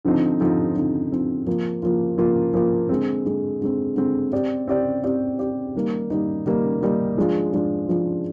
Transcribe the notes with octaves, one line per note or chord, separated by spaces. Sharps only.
D3 F3 C4 D#4
D3 F3 C4 D#4
D3 F3 C4 D#4
D3 F3 C4 D#4
F3 A#3 F4
F3 A#3 F4
F3 A#3 F4
F3 A#3 F4
D3 G#3 C4
D3 G#3 C4
D3 G#3 C4
D3 G#3 C4
C4 G4 D5
C4 G4 D5
C4 G4 D5
C4 G4 D5
D#3 G3 A#3 D#4
D#3 G3 A#3 D#4
D#3 G3 A#3 D#4
D#3 G3 A#3 D#4
F3 G#3 D4 F4
F3 G#3 D4 F4
F3 G#3 D4 F4